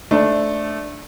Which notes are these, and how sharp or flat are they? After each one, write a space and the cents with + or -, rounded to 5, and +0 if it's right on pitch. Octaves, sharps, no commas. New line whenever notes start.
A3 -15 D4 +0 C5 +0